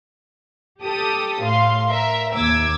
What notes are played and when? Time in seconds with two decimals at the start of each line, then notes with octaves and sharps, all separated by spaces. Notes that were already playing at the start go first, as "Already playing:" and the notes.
0.81 G4 A4 D#6
1.43 A2 F5 C6
1.89 A#4 E5
2.34 D#2 D6 E6 G#6